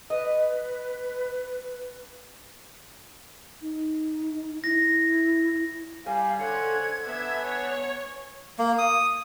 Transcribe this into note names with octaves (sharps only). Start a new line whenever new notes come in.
B4 D#5
D#4
E4 A#6
G3 F5 G#5
D3 C5 C#5 F#5 G#6
B3 D4 E5
C#5
A#3
D#6